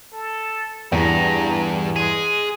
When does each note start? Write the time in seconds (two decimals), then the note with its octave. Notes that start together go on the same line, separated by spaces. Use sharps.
0.13 A4
0.92 E2 G2 A#5
1.96 G#3 G#4